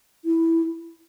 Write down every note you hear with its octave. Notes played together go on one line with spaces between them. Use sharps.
E4